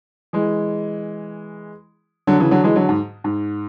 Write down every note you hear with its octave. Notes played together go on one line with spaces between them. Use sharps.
E3 G#3
D3 F#3
C#3 E3
D3 F#3
E3 G#3
D3 F#3
G#2
G#2